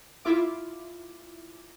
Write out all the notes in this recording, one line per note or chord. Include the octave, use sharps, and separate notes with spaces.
E4 F4 E5 D6